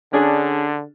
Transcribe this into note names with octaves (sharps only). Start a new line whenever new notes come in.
D3 C#4 D4 G#4